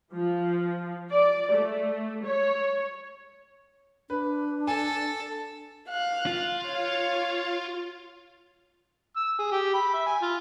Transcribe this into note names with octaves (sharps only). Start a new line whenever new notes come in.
F3
D5
A3
C#5
D4 B4
A4 G#5
F5 F#6
F4
C#5 F5
E6
G#4
G4
B5
E5
G#5
F4